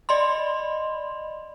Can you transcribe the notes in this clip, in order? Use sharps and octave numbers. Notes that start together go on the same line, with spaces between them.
D5 D#5 B5 C6